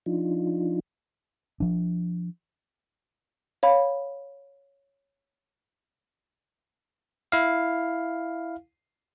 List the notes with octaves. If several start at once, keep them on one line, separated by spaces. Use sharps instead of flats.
F3 D4 D#4 F4
F3 D4
C#5 F5 B5
E4 F5